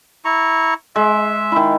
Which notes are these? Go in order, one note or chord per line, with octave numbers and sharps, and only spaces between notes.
E4 A#5 C#6
G#3 E5
D#3 E4